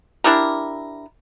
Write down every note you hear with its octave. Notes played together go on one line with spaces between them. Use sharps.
D4 E4 G4 A#4